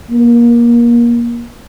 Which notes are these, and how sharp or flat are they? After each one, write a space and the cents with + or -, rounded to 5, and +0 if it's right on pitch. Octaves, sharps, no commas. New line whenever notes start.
A#3 +25